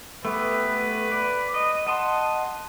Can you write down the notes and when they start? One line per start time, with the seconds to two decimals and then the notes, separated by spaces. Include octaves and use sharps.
0.25 A3 B3 G4 B4
1.12 D5
1.54 D#5
1.87 D#5 F#5 A5 C6